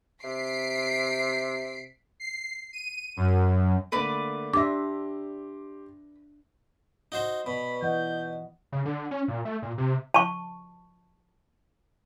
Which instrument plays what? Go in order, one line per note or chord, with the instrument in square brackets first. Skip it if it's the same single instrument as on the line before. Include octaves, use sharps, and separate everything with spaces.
[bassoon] C3 [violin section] B6 C7 D7
[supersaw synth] C7
D#7
F#2
[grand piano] D3 A3 A#3 [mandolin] B4 D5
[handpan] D4 E5 [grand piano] G4 C6 A#6 [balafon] D6
[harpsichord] D#4 F#4 C5
[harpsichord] B2 [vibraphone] B4 D5 C#6 [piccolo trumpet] B5
[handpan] E3 D#5 F#5 [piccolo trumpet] G6
[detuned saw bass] C#3
D3
C#4
A#2
A3
A#2
C3
[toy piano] A5 C#6